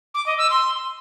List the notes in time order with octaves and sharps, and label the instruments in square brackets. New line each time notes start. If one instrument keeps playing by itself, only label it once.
[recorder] D6
D#5
E6
C6